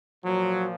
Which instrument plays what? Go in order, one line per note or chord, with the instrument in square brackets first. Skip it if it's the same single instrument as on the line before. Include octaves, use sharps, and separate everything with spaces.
[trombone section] A#2 F3 F#3